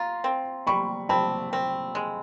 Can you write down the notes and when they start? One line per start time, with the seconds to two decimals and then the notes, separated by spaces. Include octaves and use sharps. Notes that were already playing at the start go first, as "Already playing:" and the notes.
Already playing: F4 A#5 C6
0.24 C4
0.67 G3 B5 C#6
1.09 C4 A5 B5
1.53 C4
1.95 G#3